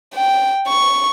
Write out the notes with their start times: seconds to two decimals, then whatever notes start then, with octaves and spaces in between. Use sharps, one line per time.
0.14 G5
0.67 C#6